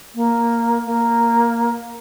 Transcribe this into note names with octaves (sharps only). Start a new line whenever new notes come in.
A#3
A#3